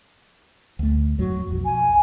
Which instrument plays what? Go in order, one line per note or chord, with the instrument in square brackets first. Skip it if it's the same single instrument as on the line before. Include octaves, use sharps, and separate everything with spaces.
[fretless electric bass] D2 A3
[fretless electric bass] F2 G#2 F#3 [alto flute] F#4
[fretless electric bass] B1 F2
[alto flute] G#5